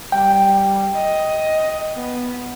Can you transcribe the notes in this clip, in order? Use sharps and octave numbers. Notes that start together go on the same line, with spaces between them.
G3 G5
D#5
B3